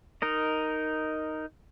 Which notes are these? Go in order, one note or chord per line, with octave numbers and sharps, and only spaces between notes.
D#4 A#4 D#5